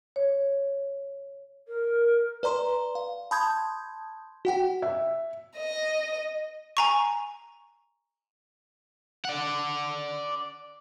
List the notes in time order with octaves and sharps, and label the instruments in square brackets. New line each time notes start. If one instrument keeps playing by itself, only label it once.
[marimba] C#5
[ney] A#4
[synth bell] B4 D5 A#5 C6
F5
A5 B5 C6 D#6 G6 G#6
F#4 F#5 G5
[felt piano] E5
[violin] D#5
[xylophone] G#5 A#5 C#6
[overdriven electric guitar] D5 F#5